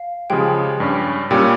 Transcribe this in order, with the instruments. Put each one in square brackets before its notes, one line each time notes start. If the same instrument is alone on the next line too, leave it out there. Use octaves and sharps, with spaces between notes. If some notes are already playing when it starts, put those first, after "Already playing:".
Already playing: [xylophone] F5
[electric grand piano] C#3 F3 G#3 [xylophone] G4 G5
[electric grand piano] G2 G3 C#4
[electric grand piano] A#2 G3 C#4 [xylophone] G4 G5